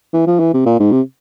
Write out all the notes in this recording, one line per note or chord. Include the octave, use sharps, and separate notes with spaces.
E3
F3
E3
C3
A#2
G#2
C3